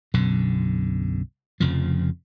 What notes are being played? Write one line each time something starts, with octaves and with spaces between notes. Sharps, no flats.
B1 F#2 B2 D3
F1 F2 C#3 F3